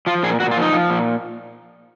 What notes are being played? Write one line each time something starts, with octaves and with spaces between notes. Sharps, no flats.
F3 F4
A#2 G#4
A#2 F#4
F4
F3 D#4
F3
A#2